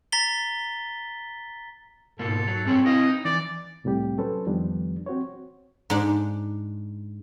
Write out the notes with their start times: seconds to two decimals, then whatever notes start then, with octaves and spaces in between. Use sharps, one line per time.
0.12 A#5 A6 B6 G7
2.19 G#2 B2 A#3 A4
2.47 F#3
2.65 G2 C4 G#4 C#5
2.86 E4 B4 D#5 F5
3.09 D#4
3.25 E3 D5
3.84 C2 A2 C3 G3 G4
4.18 F#3 C#4 A4 B4 C5
4.46 F2 D#3 F3 G3 B3 D4
5.06 C4 F#4 C5 C#5
5.90 G#2 D4